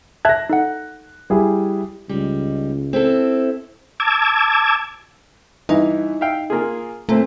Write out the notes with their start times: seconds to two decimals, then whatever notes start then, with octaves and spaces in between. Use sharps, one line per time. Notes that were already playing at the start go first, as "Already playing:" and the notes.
0.25 E5 A5 F#6 G#6 A#6
0.49 D#4 A4 F#5
1.30 G3 E4 G#4
2.09 C#2 G3 D#4
2.93 C4 E4 A4
4.00 A5 D6 E6 G#6
5.69 G2 E3 D#4
6.21 E5 F5 G5
6.50 A#3 F4 G#4
7.09 A#2 A3 C4